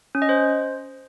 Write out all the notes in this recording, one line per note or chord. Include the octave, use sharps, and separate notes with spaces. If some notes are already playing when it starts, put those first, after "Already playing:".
C#4
D#5
C5